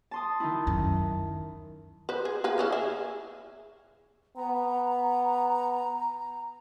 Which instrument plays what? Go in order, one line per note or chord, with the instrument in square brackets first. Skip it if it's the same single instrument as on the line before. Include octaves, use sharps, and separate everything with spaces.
[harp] A5 C6 D#6
D#3 D#4 E4
[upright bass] F#2
[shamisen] B4 C5
G#4
A#3 G#4 B4
C#3 C#4 E4
G#4 E5
[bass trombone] B3 [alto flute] A#5